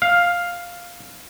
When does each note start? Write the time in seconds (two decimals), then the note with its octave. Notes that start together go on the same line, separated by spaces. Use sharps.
0.02 F5